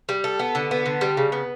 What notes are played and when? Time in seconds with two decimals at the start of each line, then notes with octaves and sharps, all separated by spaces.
0.09 G3
0.24 A4
0.39 B3
0.55 D3
0.71 B3
0.86 D3
1.01 G3
1.17 C#3
1.32 B3